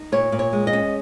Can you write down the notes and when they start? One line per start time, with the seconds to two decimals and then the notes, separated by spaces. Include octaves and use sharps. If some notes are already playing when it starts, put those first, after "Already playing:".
Already playing: D#4
0.12 A#2 C#5
0.32 A#2
0.39 C#5
0.53 G#3
0.67 D#5
0.73 C#4